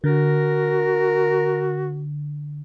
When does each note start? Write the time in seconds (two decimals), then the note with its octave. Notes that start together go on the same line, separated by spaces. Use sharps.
0.04 D3 F#4 A#4